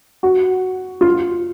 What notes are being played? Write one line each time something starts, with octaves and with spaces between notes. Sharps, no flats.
F#4
F4